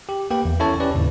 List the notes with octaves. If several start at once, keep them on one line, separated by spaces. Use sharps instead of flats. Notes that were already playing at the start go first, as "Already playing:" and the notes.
G4
A#3 G4 B4 G5
E2
C#4 E4 A4 C#5 A5
C#4 E4 G4 B4 D5
D#2 G#2 C#3